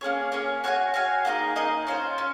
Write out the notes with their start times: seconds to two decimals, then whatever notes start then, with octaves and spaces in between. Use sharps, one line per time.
0.01 A#3 C#4 G#4 C#5
0.32 A#3 C#4 G#4 C#5
0.64 F#4 C#5 F5 G#5
0.94 F#4 C#5 F5 G#5
1.25 A#3 D#4 G#4 D#5
1.56 A#3 D#4 G#4 D#5
1.87 C#4 F4 C5
2.18 C#4